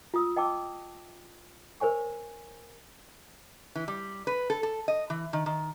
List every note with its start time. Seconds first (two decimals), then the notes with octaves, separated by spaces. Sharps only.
0.14 F4 D#6 E6
0.36 D#5 G5 A5 D6 E6
1.80 A#4 C5 C#5 G#5 C#6
3.75 E3
3.88 G3
4.27 B4
4.50 A4
4.63 A4
4.88 D#5
5.10 E3
5.33 D#3
5.46 D#3